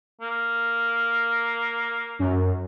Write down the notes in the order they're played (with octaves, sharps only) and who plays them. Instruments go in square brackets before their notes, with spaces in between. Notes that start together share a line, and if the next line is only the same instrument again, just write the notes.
[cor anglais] A#3
[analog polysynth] F#2